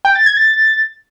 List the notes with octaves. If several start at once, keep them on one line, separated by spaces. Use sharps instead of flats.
G5
A6
G#6
A6